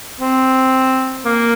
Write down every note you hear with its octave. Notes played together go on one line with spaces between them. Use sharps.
C4
A#3